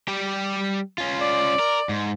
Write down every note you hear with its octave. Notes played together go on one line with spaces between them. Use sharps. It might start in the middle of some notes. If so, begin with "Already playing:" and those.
G3 G4
C#4 F4
D5
A#4
G#2